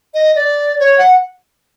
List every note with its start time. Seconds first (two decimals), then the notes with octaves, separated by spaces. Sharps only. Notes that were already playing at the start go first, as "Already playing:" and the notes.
0.14 D#5
0.36 D5
0.79 C#5
0.98 F#5